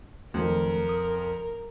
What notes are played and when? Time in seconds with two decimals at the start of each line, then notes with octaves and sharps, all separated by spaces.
0.34 F2 D#3 F#3 A3 A#4
0.89 D#6